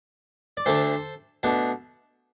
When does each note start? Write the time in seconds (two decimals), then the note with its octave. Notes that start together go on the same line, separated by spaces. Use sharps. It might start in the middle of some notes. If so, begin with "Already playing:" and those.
0.57 D5
0.66 D2 D3 A3 D4 A4 C5
1.43 B2 A3 D4